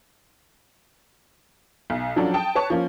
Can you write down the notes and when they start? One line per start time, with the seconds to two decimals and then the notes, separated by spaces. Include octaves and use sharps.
1.90 B1
2.16 F3 F#3 C#4 D4 A4
2.34 G5 A5 D#6
2.55 B4 C#5 A5 C#6
2.70 F3 A#3 C#4